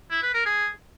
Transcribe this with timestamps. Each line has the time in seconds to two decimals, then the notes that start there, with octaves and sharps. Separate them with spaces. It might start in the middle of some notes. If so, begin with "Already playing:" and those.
0.11 E4
0.22 B4
0.34 A#4
0.46 G#4